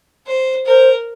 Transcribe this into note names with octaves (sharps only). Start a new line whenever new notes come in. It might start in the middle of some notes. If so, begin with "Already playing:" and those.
C5
A#4 C5